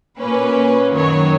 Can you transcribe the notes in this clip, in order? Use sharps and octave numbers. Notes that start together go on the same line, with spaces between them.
A#2 A#3 C#4 B4
F#2 D#3 F#3 C#5